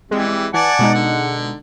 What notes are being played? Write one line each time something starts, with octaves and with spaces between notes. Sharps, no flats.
E3 G3 G#3 C4
C4
E3 D5 F#5 G#5 A5
B2 G#3 D#4
D3